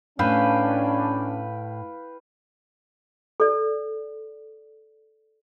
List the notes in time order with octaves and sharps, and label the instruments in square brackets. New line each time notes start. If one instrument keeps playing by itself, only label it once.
[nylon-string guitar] A2 [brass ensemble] C#4 D4 [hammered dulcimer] B4 F5 G5
[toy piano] A4 D5